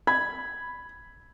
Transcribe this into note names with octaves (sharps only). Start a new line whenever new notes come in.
B5 G#6